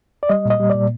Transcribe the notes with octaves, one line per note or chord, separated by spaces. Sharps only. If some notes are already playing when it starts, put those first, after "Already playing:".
D5
G3 D#5
A#2 D#5
G3
D5
A#2